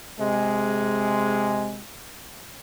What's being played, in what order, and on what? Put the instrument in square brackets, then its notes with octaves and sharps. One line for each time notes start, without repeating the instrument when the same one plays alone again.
[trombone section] C3 G#3